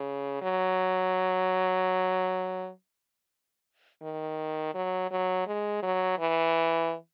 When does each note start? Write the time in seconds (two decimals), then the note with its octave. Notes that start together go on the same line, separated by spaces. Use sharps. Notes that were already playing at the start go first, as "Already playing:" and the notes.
Already playing: C#3
0.42 F#3
4.02 D#3
4.74 F#3
5.11 F#3
5.47 G#3
5.82 F#3
6.19 E3